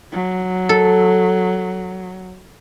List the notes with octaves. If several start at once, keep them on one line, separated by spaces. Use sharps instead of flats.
F#3
A4